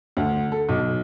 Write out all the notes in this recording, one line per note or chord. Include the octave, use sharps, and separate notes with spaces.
D2
A4
B1